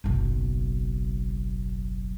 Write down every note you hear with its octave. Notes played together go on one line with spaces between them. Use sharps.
F#1 B1